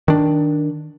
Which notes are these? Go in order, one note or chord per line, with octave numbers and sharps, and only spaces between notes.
D#3 D4